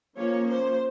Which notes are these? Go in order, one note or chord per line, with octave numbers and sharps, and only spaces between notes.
F3 A#3 C#4 C#5
C5